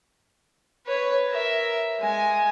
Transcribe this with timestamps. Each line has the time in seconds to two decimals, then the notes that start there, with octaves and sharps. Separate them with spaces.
0.87 B4 C#5
1.30 A#4 E5
2.00 G#3 G#5